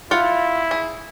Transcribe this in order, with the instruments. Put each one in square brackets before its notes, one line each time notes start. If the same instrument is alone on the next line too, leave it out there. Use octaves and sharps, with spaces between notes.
[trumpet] E4 [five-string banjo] F4 F5 F#5
[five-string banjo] G#4